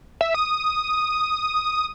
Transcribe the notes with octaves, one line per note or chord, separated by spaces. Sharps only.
E5
D#6